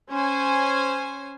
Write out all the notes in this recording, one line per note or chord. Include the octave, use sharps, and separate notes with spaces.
C#4 C5 G#5